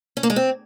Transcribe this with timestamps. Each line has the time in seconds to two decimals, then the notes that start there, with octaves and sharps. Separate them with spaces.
0.17 C#4
0.23 A#3
0.30 G#3
0.36 C4